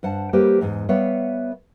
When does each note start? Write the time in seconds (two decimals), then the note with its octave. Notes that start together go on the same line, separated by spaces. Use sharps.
0.03 G2 C5 F#5 A5
0.33 G3 A#3 G4 B4 C5
0.61 E2 G#2
0.89 G3 B3 B4 C#5 E5 F5